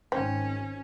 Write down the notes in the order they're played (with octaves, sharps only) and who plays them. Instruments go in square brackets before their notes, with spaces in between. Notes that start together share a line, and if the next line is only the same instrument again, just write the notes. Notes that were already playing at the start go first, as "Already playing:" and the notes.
[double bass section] G#1 [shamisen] C4 [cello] C#4